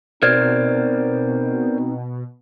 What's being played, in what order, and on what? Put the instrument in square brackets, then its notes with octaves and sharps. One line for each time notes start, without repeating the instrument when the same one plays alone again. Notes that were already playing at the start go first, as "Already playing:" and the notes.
[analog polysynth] B2 [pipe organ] C4 D#4 [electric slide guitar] A#4 C5 D5 [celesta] F6 G#6